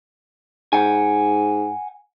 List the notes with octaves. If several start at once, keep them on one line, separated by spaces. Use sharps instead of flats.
G#2 F#5 G#5